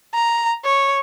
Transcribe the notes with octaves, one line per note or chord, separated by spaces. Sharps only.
A#5
C#5